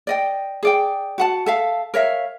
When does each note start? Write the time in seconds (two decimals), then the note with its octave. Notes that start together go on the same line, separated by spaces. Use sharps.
0.07 D5 D#5 G5
0.63 G#4 D5 G5
1.18 F#4 F#5 A5
1.46 A4 E5 F5
1.94 A#4 C#5 E5 F5